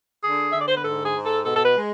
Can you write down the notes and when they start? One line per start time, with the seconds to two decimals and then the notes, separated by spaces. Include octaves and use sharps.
0.24 D3 G#4
0.53 D3 E5
0.60 D5
0.68 C5
0.77 B4
0.84 G#2 A4
1.05 G#4
1.14 G#2
1.25 A4
1.45 B2 A4
1.56 A4
1.65 B4
1.75 G#3